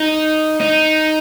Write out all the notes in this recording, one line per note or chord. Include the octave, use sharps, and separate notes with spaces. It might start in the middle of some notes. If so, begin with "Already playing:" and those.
Already playing: D#4
D#4